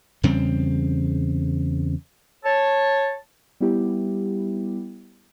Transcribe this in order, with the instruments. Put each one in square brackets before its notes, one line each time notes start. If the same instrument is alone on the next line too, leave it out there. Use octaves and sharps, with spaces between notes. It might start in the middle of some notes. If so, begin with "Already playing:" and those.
[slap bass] E2 C#3 G3 C4
[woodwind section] C#5 A5
[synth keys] G3 B3 E4 G4